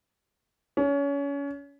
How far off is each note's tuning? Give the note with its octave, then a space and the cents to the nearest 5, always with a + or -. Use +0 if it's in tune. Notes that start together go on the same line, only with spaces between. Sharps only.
C#4 +30